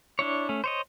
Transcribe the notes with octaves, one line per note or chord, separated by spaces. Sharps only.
D4 E4 C#5
A3 C#4
C5 C#5 D#5